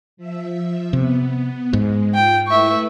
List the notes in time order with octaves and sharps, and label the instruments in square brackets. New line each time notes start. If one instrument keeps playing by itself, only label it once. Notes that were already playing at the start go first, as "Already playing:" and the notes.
[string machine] F3 E5
[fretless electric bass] C3 [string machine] B3
[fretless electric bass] G#2 [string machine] G#3
[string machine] F4 [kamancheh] G5
[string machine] A3 E4 B4 [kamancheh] E5 C#6